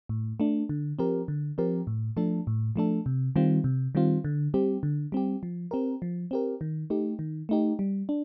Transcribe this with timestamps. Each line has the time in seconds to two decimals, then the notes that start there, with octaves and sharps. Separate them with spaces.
0.09 A2
0.40 A3 D4
0.69 D3
0.99 F3 C4 G4 A#4
1.28 D3
1.58 F3 C4 G4 A#4
1.87 A2
2.17 F3 A3 D4 A4
2.47 A2
2.76 F3 A3 D4 A4
3.06 C3
3.36 D#3 G3 C4 F4
3.64 C3
3.95 D#3 G3 C4 F4
4.24 D3
4.54 G3 C4 G4
4.83 D3
5.12 G3 C4 G4
5.43 F3
5.71 C4 G4 A#4
6.02 F3
6.31 C4 G4 A#4
6.61 D#3
6.90 A3 D#4 G4
7.19 D#3
7.49 A3 D#4 G4
7.79 G3
8.09 D4